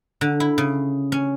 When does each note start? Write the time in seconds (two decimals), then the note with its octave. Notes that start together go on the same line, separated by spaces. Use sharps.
0.21 D3
0.40 E4
0.58 C#3
1.12 C#4